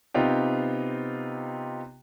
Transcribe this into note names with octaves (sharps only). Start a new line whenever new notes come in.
C3 B3 C4 D#4 F4 G4